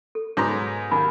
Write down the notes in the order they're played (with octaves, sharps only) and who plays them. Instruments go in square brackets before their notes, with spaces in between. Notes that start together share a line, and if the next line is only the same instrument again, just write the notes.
[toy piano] A4
[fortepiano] G#2 B2 A#5 [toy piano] C#5 C6 D6
[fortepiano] D#2 [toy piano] B5